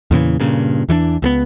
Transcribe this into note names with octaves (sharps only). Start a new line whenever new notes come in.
E2 A#2 C#3 E3
G2 A#2 C#3
E2 E3 F3 D4
C#2 A3 B3